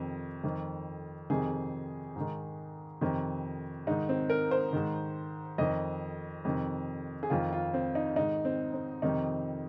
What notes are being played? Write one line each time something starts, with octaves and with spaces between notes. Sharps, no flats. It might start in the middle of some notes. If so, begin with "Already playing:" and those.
Already playing: F2 C3 D#3
F2 D#3
F2 C3 D#3 G#4
G#2 D#3
F2 C3 D#3
G#2 D#3 D#4
C4
A#4
C5
G#2 D#3
F2 D#3 D#5
F2 C3 D#3
G#4
F2 D#3 F4
F4
C4
D#4
G#2 D#3 D#4
C4
C4
F2 C3 D#3 D#4